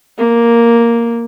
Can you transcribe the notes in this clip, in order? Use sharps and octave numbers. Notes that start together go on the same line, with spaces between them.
A#3